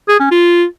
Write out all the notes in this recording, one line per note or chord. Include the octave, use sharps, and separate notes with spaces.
G#4
C#4
F4